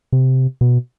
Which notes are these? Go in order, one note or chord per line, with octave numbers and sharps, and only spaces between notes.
C3
B2